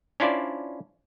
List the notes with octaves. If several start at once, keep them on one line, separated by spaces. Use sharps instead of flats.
C#4 D4 E4 F4 C5 D5